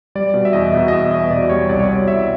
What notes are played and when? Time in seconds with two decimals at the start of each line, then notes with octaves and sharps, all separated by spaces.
0.15 G3 D5
0.34 B2
0.45 E5
0.53 E2 D#5
0.72 B2 E5
0.88 D#5
0.93 E2 E5
1.11 E2 D#5
1.30 B2 D5
1.49 G3 C#5
1.69 C2 D5
1.79 C#5
1.88 B2 D5
2.07 C2 E5